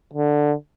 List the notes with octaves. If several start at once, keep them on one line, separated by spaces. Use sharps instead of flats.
D3